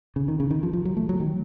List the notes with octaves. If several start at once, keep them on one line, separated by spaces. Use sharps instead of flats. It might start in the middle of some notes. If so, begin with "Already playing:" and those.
C#3
D#3
C#3
D#3
F3
F3
F#3
A3
F#3
D#3